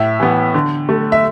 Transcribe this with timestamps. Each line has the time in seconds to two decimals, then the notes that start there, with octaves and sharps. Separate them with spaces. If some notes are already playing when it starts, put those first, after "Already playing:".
Already playing: A2 E5
0.20 E3 B3
0.54 D3
0.89 A3
1.12 E5